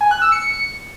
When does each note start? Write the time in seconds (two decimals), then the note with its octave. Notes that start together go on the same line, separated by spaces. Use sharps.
0.01 G#5
0.11 F#6
0.22 E6
0.32 C#7